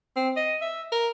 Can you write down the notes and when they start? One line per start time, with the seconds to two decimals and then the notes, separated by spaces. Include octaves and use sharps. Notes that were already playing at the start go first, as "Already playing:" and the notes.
0.16 C4
0.37 D#5
0.61 E5
0.92 A#4